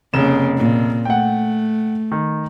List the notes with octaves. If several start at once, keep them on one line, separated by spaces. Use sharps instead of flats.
F1 C#3 A#3 E7
A#2
A3 F#5 G5
D#3